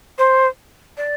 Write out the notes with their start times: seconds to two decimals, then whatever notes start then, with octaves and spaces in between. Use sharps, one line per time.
0.18 C5
0.97 D5